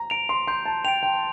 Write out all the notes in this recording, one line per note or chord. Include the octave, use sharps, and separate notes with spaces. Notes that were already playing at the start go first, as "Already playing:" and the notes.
Already playing: A#5
A#5 D7 F7
C6
C6 G6
A5
G5 D7 F7
G5